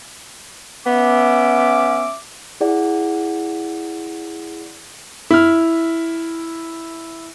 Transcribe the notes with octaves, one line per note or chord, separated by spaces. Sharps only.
B3 C#4 E5 D6
E4 G#4 D5 F#5
E4 F6